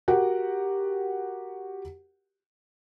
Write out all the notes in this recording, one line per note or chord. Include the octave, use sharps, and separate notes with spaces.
F#4 G4 A#4 F#5